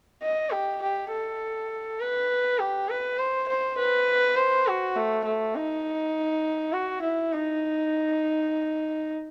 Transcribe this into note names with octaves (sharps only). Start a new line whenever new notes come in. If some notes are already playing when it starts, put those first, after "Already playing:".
D#5
G4
G4
A4
B4
G4
B4
C5
C5
B4
C5
F#4
A3
A3
D#4
F#4
E4
D#4